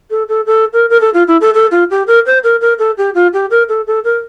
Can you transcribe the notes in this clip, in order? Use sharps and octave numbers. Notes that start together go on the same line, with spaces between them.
A4
A4
A4
A#4
A#4
A4
F4
E4
A4
A4
F4
G4
A#4
C5
A#4
A#4
A4
G4
F4
G4
A#4
A4
A4
A#4